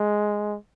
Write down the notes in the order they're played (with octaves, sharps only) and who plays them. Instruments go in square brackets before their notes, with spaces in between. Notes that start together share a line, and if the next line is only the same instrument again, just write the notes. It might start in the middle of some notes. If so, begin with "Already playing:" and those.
Already playing: [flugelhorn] G#3